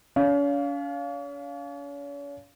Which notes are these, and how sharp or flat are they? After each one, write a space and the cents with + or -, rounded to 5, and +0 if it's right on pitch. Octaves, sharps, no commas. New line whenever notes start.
C#4 +45 F5 +0